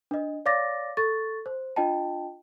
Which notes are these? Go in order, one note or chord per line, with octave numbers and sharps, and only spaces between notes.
D4 D#5
C#5 D5 F5 D6 A6 A#6
A4 C#6 A6
C5
D4 F4 D#5 G5 A5